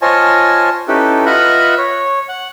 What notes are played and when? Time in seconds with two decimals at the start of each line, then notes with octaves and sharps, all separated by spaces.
0.02 F4 C5 C#5 D#5 G#5 A5
0.88 C#4 D#4 E4 G4 A4 B4
1.26 F4 B4 D#5 E5 F#5 B5
1.78 C#5
2.29 F#5